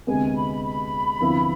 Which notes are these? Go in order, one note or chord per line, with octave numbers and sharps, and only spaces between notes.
D2 C3 G#3 B3 G#5
B5
B5
D2 C3 F3 B3 E4